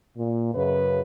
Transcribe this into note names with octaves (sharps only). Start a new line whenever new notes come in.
A#2
F#2 C#3 B4